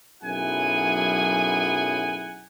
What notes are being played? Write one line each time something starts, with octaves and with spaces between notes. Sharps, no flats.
B1 F#2 E4 G#4 F#5 G#5